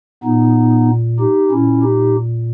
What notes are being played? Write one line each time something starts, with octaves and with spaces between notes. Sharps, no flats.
A#2 B3 D#4
D#4 G4
A#2 C#4 E4
D#4 G4